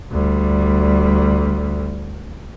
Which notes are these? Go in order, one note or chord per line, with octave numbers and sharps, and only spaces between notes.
D2 G3